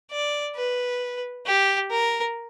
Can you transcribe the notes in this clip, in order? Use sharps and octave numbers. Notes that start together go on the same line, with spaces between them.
D5
B4
G4
A#4